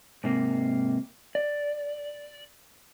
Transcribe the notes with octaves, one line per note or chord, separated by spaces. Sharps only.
G#2 C3 A#3
D5